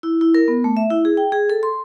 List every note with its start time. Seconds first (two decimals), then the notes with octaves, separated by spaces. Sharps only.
0.03 E4
0.21 E4
0.35 A#4
0.48 B3
0.64 A3
0.77 E5
0.90 E4
1.05 G#4
1.17 G5
1.32 G#4
1.50 A4
1.63 C6